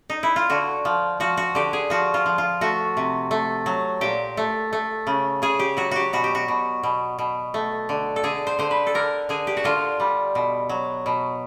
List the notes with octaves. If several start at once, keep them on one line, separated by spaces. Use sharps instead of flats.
D#4
E4
F4
D3 F#4
F3
F3 F#4
F#4
D3 G4
G#4
F3 F#4
F4
F3
F4
A3 F#4
C3
A3
F#3
A#2 G4
A3
A3
C#3
C#3 G#4
G4
F#3 F#4
F#4 G4
B2 F#4
G4
F#4
B2
B2
B2
A3
D3
A4
D3 G#4
C5
D3 C5
B4
A4
D3 A#4
D3 G#4
G4
F#4
D3 F4
G3
B2
F#3
B2